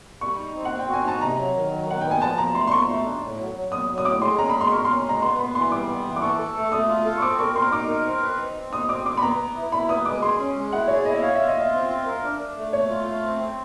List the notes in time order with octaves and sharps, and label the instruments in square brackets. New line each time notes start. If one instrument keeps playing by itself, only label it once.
[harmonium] G3 [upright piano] C#6
[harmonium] D#4
C4
[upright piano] F#5
[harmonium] C4
[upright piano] G5
[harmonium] F#4 [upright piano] G#5
[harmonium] D#4 [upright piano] A5
[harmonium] C3 [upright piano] A#5
[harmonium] F#3
D#3
F#3
[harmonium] D#3 [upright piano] F#5
[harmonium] B3 [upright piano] G5
[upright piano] G#5
[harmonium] F3 [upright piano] A5
[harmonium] F3 [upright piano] A#5
[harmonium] A3 [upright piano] C6
[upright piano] C6
[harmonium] F3 [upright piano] C#6
[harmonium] A3
D4
A2
F#3
F#3
[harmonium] F#3 [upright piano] D#6
[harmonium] F#3
[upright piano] D#6
[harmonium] A2 [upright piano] D6
[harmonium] G#3 [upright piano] C6
[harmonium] C#4 [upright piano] A#5
[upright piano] B5
[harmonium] G#3
[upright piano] C6
[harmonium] A#4 [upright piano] C#6
[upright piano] C6
[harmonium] C#4
[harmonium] G#3 [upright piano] A#5
[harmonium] B3 [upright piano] C6
[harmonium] B3 [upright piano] B5
[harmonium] E3 [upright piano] C6
[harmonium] G3 [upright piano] D6
[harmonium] B3
E3
[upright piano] D6
[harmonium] A4 [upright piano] C#6
[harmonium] A4
A3
[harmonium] A3 [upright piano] D#6
[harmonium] F4
A4
[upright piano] C#6
[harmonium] C4 [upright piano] D6
[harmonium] A#4 [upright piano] C#6
[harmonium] A#4 [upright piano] C6
[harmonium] D#4 [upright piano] D6
[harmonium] A#4
C4
B4
D#4
C4
[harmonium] D#4 [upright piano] D#6
[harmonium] C4 [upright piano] D6
[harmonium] C4 [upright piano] D6
[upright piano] B5
[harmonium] B3 [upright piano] A#5
[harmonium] B3
E4
[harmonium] E4 [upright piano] B5
[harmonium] B3 [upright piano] D#6
[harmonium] G#3 [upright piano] D6
[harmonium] G#4 [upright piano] C6
[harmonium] C#4
G#3
[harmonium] E4 [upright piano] F#5
[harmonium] G#4 [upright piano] C#5
[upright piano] D5
[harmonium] E4 [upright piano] D#5
[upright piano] E5
[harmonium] C#5 [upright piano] F5
[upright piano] E5
[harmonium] F4
[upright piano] D#5
[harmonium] F4 [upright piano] E5
[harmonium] C4
F4
A#4
D4
D4
A3
[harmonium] A3 [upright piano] C#5
[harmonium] F4
A3
C4
C4